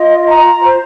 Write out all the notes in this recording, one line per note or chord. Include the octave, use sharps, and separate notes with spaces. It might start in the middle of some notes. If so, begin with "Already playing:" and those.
Already playing: F4 D#5
A#5
C5